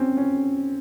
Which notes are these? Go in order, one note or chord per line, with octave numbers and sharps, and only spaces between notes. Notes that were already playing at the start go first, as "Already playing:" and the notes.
Already playing: C4 C#4
C#4